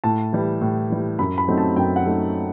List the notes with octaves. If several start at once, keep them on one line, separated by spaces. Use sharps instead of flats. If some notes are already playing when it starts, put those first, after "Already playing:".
A2 A5
E3 G3
A2
E3 G3
F#2 B5
B5
F#3 A3 C4 D#4
A5
F#2 G5
F#5
F#3 A3 C4 D#4